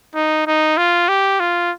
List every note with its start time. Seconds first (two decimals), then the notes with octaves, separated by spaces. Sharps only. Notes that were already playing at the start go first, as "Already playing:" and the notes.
0.15 D#4
0.47 D#4
0.78 F4
1.09 G4
1.40 F4